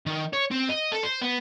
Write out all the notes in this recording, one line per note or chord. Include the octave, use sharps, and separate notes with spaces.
D#3
C#5
C4
D#5
A4
C5
B3